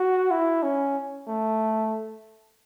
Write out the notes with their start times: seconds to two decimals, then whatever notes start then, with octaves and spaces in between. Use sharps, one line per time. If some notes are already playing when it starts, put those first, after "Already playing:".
Already playing: F#4
0.31 E4
0.63 C#4
1.28 A3